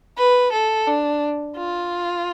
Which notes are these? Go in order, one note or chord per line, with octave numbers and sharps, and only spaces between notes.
B4
A4
D4
F4